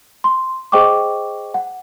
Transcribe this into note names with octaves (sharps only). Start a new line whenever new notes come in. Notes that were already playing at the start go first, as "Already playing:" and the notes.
C6
G#4 C5 D#5 G5 C#6 D6
F#5